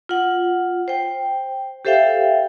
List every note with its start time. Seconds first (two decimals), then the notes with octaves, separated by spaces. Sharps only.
0.09 F4 F#5
0.88 C5 G5
1.85 G4 A4 C5 E5 F5 G5